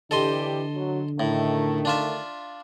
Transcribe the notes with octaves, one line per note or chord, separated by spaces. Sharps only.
D3 E3 D4 G4 A4 D#5 C6
F#3
A2 D#3 A3
D4 F4 E5